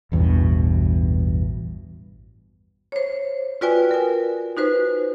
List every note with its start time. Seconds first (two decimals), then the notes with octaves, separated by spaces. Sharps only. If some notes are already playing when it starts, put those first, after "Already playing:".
0.12 A1 E2 G2 B2
2.92 C5 C#5
3.61 F4 F#4 B4 D5 G5 G#5
3.91 A#4 G#5
4.57 D#4 F#4 B4 C5